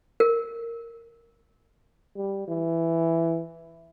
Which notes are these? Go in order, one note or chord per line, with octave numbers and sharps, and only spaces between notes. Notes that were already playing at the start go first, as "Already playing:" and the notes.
A#4
G3
E3